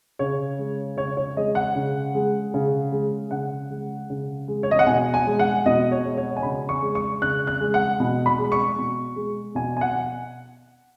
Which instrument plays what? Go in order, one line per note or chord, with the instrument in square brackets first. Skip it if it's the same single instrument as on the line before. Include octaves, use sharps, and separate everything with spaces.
[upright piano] C#3 C#5
G#3
C#3 C#5
C#5
G#3 D#5
F#5
C#3
G#3
C#3
G#3
C#3 F#5
G#3
C#3
G#3
C#5
D#5
F#5
B2 G#5
G#5
G#3
F#5
B2 D#5
C#5
G#3
C#5
G#5
C#3 B5
C#6
G#3
C#6
C#3 F#6
F#6
G#3
F#5
B2
B5
G#3
C#6
B2
G#3
B2 G#5
G#5
F#5